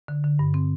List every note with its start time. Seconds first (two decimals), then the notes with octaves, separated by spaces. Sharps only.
0.08 D3
0.24 D3
0.39 G2
0.54 C4